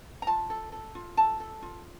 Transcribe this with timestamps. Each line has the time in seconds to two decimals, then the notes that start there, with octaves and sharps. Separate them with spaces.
0.22 A#5
0.27 F4 A5
0.50 A4
0.72 A4
0.95 F4
1.17 A4 A5
1.40 A4
1.63 F4